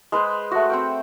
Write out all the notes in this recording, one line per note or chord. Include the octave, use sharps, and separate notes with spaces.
G#3 B4 C5
A3 F#4
C4 F#5 G5